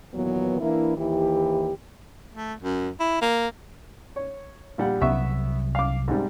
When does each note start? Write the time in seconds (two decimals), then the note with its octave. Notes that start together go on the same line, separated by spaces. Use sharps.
0.14 D#2 A#2 E3 F#3 B3
0.61 E3 A#3 D4 E4
0.97 D#2 E3 E4 G4
2.34 A3
2.62 F#2
3.00 E4
3.21 A#3
4.16 C#5
4.78 A#1 G3 F#5
5.02 C2 F#3 B3 E5 C#6
5.75 F5 D6
6.08 G#2 C3 G3